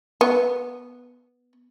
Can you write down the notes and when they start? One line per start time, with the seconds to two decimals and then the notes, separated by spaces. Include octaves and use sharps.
0.21 B3